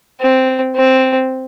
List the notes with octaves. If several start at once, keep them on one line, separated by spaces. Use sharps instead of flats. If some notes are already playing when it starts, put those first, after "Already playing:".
C4
C4